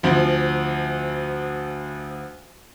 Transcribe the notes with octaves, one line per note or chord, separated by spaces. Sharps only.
D2 F3